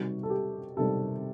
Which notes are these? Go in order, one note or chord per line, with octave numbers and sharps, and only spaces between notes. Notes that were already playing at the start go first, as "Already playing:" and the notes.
Already playing: C3 D#3 G3 F#4
A4
G4
C3 D#3 G3 A4